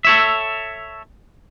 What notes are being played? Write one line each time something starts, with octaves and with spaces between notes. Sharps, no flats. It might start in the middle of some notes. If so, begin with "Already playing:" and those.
A4 C#5 E5